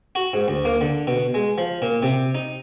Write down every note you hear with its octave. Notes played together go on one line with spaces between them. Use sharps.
F#4
G#2
D2
A#3
D3
B2
G#3
F3
A#2
C3
D#4